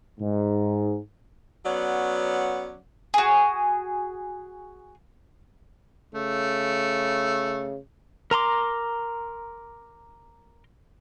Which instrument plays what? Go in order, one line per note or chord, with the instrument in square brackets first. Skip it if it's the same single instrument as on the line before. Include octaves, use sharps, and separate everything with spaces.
[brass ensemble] G#2
[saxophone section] F#3 B3 C#4 D5 F#5
[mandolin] F#4 G#4
[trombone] C#3 [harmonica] A3
[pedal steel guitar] A#4 A#5 C6 D6